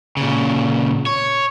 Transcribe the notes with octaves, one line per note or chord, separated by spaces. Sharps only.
A#2 C#3
C#5